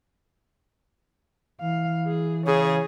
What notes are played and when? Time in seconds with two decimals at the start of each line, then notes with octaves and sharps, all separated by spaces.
1.60 E3 F5
2.07 G#4
2.47 C#3 G#4 C#5